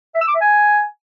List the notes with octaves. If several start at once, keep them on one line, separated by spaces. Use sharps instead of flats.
E5
E6
D6
E5
G#5